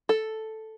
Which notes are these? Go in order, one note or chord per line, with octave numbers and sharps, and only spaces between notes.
A4